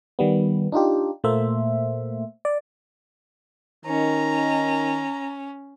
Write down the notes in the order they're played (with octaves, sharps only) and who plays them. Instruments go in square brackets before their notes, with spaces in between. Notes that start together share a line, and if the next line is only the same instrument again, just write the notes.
[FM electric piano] D#3 G3 B3
D4 D#4 F4 G4
A#2 A3 A#3 C5 E5
D5
[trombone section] D#3 [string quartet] C#4 [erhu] A#5